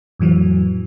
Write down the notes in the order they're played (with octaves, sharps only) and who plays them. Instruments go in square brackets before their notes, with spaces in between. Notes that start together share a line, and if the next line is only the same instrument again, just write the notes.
[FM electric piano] F2 A2 E3 F#3